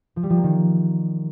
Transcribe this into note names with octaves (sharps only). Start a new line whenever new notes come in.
F3
G3
F3
A#3
D#3